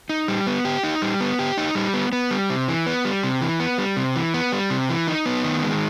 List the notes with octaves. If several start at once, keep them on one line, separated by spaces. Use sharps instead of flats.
D#4
G3
B3
G4
D#4
G3
B3
G4
D#4
G3
B3
B3
G3
C3
E3
B3
G3
C3
E3
B3
G3
C3
E3
B3
G3
C3
E3
D#4
B3
D#3
G#3